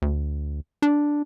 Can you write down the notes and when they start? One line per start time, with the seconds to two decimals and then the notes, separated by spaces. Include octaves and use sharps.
0.02 D2
0.82 D4